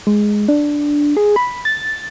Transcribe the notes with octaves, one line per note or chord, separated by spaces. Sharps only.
G#3
D4
G#4
B5
A6